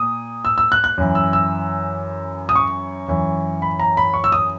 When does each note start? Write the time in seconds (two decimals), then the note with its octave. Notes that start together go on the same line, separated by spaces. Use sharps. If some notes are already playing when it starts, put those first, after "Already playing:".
Already playing: A#2 D#6
0.45 E6
0.58 E6
0.72 F#6
0.84 F#6
0.98 F#2 E3
1.15 E6
1.33 E6
2.49 D#6
2.56 C#6
3.08 F#2 E3
3.62 B5
3.80 A#5
3.97 B5
4.14 C#6
4.24 E6
4.32 D#6